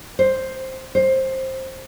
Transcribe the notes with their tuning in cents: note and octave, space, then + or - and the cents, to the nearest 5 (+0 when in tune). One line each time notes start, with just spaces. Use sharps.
C5 +5
C5 +15